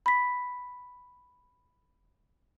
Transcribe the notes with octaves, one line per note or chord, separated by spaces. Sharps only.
B5 B6